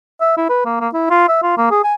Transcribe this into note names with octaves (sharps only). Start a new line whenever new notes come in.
E5
E4
B4
A#3
A#3
E4
F4
E5
F4
A#3
G#4
G#5